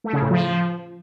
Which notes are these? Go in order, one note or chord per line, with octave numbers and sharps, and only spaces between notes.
A3
C#3
A2
F3